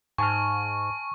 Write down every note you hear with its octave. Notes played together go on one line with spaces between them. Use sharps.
G#2 G#5 A5 C#6 F6